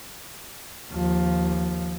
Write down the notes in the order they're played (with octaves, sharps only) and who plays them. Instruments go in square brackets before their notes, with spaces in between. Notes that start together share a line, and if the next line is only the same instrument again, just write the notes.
[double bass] D#2 F3